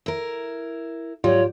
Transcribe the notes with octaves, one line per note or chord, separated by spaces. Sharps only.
E4 A#4
G#2 F#3 F4 G4 C#5 D5